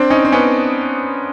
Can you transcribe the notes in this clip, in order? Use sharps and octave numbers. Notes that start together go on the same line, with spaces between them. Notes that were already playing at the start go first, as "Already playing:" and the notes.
Already playing: C4 D4
C#4 D#4
C4
B3 C#4